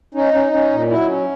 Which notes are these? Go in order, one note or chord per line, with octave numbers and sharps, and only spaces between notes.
C#4 D#4
C#4
C#4
A#2
F#3 E4
C#4